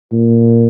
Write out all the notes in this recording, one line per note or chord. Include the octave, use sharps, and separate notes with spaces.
A#2